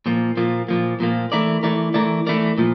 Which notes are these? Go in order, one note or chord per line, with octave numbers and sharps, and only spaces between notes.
A#2 F3 A#3
A#2 F3 A#3
A#2 F3 A#3
A#2 F3 A#3
E3 A3 E4 A#4 D5
E3 A3 E4 A#4 D5
E3 A3 E4 A#4 D5
E3 A3 E4 A#4 D5
A#2 F3